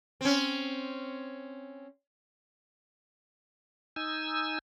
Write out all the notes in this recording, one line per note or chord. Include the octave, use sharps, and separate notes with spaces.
C4 C#4
D#4 G#5 E6